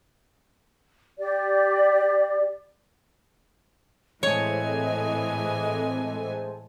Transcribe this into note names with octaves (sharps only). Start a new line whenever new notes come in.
G4 D5
A2 E3 G#3 C4 A4 C#5 D#5 G#5